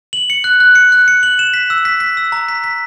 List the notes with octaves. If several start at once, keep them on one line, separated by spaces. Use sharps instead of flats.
F#7
C#7
F#6
F#6
C#7
F#6
C#7
F#7
E7
B6
E6
B6
B6
E6
A#5
B6
B6